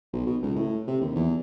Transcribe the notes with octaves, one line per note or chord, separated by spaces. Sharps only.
B1
B2
C#2
A2
C3
D#2
E2